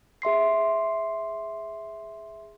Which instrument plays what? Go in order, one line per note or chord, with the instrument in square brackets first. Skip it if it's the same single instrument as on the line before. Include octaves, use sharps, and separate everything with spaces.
[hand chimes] G#4 E5 C6 C7